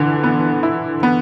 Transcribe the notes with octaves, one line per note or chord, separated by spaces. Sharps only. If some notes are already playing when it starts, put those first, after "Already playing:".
Already playing: D3 E3
B3
E4
B3